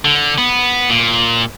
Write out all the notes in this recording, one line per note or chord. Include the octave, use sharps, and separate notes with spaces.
D3
B3
A#2